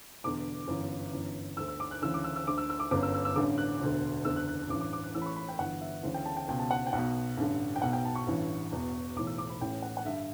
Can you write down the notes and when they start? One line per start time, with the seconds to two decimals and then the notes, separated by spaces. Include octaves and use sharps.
0.24 E1 E2 D3 D6
0.68 G1 F#2 E3
1.12 G1 F#2 E3
1.57 D2 D3 E6
1.68 E6
1.80 D6
1.91 F#6
2.02 D2 C#3 E3 E6
2.14 D6
2.24 E6
2.36 E6
2.47 D2 D3 D6
2.58 E6
2.70 E6
2.80 D6
2.91 G1 F#2 D3 D6
3.03 E6
3.14 E6
3.25 E6
3.36 A1 G2 D3 D6
3.58 F#6
3.81 E1 D2 D3
4.25 F#1 E2 D3 E6
4.36 F#6
4.48 F#6
4.59 F#6
4.69 A1 G2 E3 D6
4.81 D6
4.93 D6
5.03 F#6
5.15 A1 A2 E3 E6
5.22 B5
5.26 C#6
5.36 B5
5.49 G5
5.59 G1 G2 E3 F#5
5.81 E5
6.03 D2 C#3 E3
6.14 G5
6.25 A5
6.37 G5
6.48 C#2 B2 G5
6.59 A5
6.71 F#5
6.87 G5
6.93 B1 B2 F#5
7.37 A1 G2 D3
7.76 G5
7.82 B1 B2 F#5
7.93 G5
8.05 A5
8.15 C#6
8.27 A1 G2 E3
8.72 E1 E2 B2
9.16 B1 A2 E3 D6
9.27 E6
9.38 D6
9.50 B5
9.61 A1 A2 E3 G5
9.82 F#5
9.97 F#5
10.05 G2 D3 E5